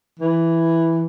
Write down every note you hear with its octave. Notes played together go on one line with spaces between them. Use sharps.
E3